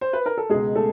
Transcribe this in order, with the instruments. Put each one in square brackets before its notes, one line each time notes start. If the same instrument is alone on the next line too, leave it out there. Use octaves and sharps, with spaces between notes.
[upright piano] C5
B4
A#4
A4
C#2 B2 G#3 G#4
A3 A4